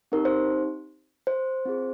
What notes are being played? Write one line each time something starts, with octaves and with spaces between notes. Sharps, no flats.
C4 D#4 G4 A#4
C5
C5
C4 F4 G#4